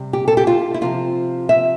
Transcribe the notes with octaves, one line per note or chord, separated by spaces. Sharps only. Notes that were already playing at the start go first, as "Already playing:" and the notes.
Already playing: C3 G3
G4
A4
G4
F4
E4
C3 F3 C4 F4
E5